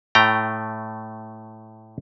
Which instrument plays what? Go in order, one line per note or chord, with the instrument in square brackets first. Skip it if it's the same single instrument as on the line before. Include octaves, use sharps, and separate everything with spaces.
[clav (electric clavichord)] A2 A3 G5 A#5